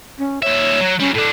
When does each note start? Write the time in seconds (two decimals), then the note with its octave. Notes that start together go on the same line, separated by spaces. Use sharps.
0.18 C#4
0.42 D#2 C#5 E5
0.81 F#3
1.00 F#3 G3 C#4
1.14 A2 D4 A4